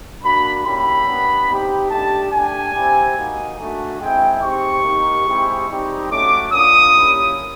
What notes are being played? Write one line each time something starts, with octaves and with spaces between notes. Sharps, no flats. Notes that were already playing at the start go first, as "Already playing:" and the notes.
A#3 D4 F#4 B5
A#3 C#4 E4 G4 B5
G3 B3 D4
C4 D#4 G4
A3 D4 G4 A5
A3 D4 G4 G#5
C4 E4 G4
A#3 D#4 F#4
A3 D4 F#4
G#3 C4 E4 G5
C4 D#4 G4 C#6
A#3 D#4 G4
G#3 C4 E4 G4
G3 C4 D#4 G4
A3 C#4 F#4 D6
A#3 D4 F4 D#6
A#3 C#4 E4 G4